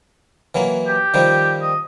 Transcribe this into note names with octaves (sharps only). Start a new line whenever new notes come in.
E3 F#3 A#3
G4
D#3 F3 G3
D#5